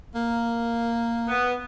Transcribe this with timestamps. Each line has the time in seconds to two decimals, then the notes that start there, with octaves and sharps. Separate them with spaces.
0.15 A#3
1.28 B3